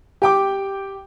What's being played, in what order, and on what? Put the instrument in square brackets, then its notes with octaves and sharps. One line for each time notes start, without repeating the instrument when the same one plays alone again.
[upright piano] G4 G5 D6